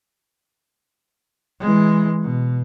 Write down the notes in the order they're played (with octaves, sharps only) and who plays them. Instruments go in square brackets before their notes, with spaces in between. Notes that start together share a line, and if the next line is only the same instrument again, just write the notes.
[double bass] E3 G#3
B2